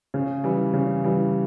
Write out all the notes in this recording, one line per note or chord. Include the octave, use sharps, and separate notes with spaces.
C#3
E3 G3
C#3
E3 G3